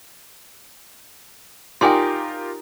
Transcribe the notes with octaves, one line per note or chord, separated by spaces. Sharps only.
D#4 F4 G4 A#4 D5 G5 G#5 C6